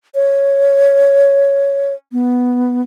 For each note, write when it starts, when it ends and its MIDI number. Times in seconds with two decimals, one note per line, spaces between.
0.15 1.94 73
2.12 2.82 59